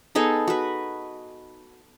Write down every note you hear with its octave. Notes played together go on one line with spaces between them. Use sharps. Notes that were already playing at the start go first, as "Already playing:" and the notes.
B3 D#4 G#4 A4
F#4 B4